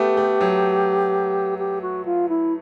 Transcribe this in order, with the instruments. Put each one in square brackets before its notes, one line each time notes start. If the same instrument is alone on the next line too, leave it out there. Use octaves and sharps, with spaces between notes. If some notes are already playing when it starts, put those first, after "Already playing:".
Already playing: [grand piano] A3 B3 [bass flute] G4
[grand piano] A3
F#3
[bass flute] G4
F#4
F4
E4